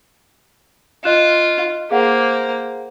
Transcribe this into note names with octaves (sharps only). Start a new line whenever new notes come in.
F4 D#5 F#6 E7
A#3 G#4 C5 F5 F#5